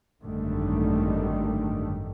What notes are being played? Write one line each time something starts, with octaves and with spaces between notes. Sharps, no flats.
G#1 F#2 D3 D#3 G3 A3